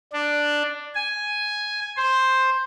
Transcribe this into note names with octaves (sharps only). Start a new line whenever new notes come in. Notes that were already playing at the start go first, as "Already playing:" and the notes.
D4
G#5
C5